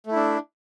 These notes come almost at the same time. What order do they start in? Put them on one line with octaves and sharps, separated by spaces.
A3 E4 D4